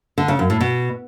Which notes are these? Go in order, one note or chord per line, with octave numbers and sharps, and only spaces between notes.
D3
C#3
F#2
A2
B2